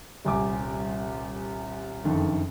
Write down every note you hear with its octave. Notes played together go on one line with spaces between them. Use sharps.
D#1 C2 G#5 D6
F#1 F2 D3 D#3